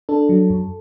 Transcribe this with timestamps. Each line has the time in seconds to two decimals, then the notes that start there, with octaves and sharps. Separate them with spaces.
0.09 D4 A4
0.29 F#3
0.50 F#2